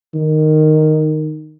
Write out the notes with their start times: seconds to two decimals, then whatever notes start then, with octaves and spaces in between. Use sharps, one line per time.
0.14 D#3